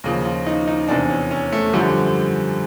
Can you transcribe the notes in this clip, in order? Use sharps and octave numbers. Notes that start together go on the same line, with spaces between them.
D#2 C#3 F3 F4
F4
D#4
D#4
E2 C3 E3 D4
C#4
C#4
A3
F#2 D3 F3 G3